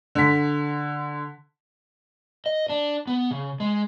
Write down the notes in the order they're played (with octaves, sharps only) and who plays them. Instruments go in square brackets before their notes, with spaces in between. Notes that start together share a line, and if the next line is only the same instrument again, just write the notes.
[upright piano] D3 B6
[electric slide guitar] D#5
D4
B3
C#3
G#3